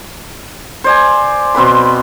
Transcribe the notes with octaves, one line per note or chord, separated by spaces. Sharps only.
C5 D5 G#5
B2 C4 B4 B5